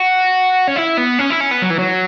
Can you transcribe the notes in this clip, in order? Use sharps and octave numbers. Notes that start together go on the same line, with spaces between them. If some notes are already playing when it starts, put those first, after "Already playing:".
Already playing: F#4
C#4
E4
B3
C#4
E4
C#4
B3
F#3
E3
F#3